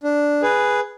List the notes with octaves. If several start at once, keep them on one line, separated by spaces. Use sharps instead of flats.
D4
G#4 B4